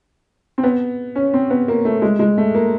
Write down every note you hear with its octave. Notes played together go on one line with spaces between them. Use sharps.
C4
B3
C#4
C4
B3
A#3
A3
G#3
G#3
A3
A#3